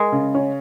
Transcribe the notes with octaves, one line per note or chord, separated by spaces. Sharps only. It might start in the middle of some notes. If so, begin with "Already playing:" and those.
Already playing: G#3 A#4
C#3
C#4